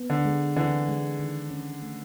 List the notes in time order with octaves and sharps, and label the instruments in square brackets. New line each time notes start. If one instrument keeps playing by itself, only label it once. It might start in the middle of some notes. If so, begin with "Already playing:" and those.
Already playing: [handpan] B3
[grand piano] D3
[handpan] G#3
[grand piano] D3 E3 [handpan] C4
[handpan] G#3
D#3
C#4
A3